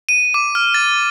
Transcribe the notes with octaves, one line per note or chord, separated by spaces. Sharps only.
D#7
D6
F6
A6